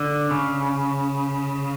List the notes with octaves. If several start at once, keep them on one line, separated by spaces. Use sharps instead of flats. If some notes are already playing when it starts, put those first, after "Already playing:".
Already playing: D3
C#3